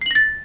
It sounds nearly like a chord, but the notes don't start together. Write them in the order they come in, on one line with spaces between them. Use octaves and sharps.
C7 F#7 A#6 A6